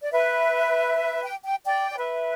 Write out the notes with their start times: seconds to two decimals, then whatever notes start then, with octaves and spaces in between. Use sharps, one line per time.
0.03 D5
0.12 B4 E5
1.23 G5
1.45 G5
1.65 D5 G5
1.91 D5
1.97 B4 E5